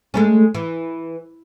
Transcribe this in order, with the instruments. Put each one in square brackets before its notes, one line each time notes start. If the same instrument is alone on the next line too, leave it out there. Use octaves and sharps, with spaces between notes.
[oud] G#3 A3 C#4
E3